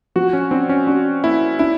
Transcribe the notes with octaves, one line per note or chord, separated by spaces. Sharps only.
F3 F#4
C#4
C4 D4
C#4
D4 F#4
A#3 E4
D4 E4